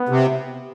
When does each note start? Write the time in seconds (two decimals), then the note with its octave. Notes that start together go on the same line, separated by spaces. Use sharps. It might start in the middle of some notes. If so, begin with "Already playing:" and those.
Already playing: B3
0.09 C3